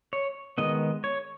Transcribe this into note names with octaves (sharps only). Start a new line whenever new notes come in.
C#5
D#3 G#3 B3 D#5
C#5